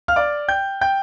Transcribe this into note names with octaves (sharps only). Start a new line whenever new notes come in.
F5 F6
D5 D6
G5 G6
G5 G6